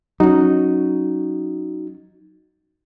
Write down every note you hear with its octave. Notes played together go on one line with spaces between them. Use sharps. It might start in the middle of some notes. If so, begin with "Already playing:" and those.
F#3 C#4 D#4 F#4